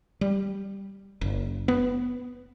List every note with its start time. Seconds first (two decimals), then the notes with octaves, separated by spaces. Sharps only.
0.21 G3
1.21 F#1
1.68 B3